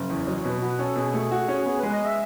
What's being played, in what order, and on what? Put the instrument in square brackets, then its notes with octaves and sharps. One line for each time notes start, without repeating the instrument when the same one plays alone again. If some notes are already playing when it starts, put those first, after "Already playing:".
Already playing: [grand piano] F#1
[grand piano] E2 [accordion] C#5
[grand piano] F#3 [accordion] D#5
[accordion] C#5
[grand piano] B2 [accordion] B4
[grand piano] F#4 [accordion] B4
[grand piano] C#4 [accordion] A4
[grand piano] B2 [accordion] G#4
[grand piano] A3
F#4
C#4
[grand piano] B3 [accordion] G#4
[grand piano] G#3 [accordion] B4
[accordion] D#5
E5